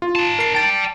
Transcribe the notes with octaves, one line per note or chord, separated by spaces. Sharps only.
F4
D#4 A5
A#4 C7
D5 G5 A5 A6